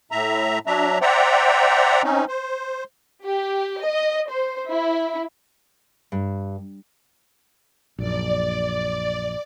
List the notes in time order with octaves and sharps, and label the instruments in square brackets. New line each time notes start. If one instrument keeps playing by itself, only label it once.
[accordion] A2 E5 A#5
F#3 D4 E5 A#5
C5 D5 E5 F#5 G5 A#5
C4 C#4 D#4
C5
[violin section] G4
D#5
C5
E4
[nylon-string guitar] G2
[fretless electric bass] A#1 F#2 [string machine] D5